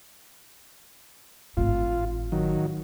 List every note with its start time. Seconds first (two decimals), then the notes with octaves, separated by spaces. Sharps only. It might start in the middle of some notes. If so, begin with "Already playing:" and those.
1.57 G#1 A2 F4
2.32 D#3 F#3